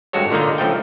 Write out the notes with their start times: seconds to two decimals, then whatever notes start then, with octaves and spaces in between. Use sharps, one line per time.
0.13 G#1 G2 G#3 F#4 A4 C#5
0.31 A#2 D3 D#3 A#3 D#4
0.58 C#2 F3 A3 G5